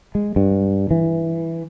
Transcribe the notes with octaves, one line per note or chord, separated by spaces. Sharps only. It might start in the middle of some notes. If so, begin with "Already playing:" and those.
G#3
G2
E3